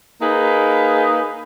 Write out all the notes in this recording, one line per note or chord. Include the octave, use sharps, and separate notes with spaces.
A#3 D#4 G#4 B4